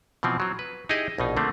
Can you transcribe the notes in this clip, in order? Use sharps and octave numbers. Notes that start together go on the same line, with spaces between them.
B2 E3 F3 C4
F#3 C4
B4
D#4 E4 G4 G#4 D#5
A#1 B2 D#4
D3 A3 A#3 C4